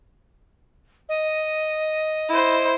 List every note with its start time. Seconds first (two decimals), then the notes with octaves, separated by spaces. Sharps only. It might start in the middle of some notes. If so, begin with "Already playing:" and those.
1.09 D#5
2.29 E4 C5